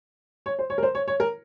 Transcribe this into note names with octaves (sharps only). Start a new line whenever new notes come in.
C#5
C5
C#5
A#4
C5
C#5
C#5
A#4